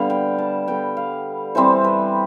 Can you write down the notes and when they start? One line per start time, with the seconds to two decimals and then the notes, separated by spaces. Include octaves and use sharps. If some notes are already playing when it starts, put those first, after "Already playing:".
Already playing: D3 G3 B3 F5
0.10 G5
0.38 A5
0.68 D3 G3 B3 G5
0.97 F5
1.55 E3 G3 C4 C5
1.84 B4